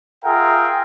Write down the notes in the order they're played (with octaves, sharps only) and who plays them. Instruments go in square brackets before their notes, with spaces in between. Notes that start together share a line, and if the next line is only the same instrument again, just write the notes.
[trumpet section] F4 G#4 A#4 E5 F#5 G5